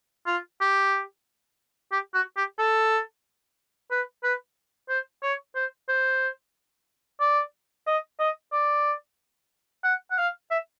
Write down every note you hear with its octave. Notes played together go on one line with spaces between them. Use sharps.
F4
G4
G4
F#4
G4
A4
B4
B4
C5
C#5
C5
C5
D5
D#5
D#5
D5
F#5
F#5
F5
E5